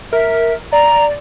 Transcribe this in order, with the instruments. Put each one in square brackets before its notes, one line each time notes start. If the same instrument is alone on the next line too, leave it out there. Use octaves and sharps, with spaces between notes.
[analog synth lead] A#4 [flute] E5
[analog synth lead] D5 [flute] A#5